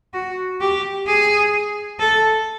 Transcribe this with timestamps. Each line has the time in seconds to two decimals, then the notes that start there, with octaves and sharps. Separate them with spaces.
0.13 F#4
0.61 G4
1.07 G#4
1.99 A4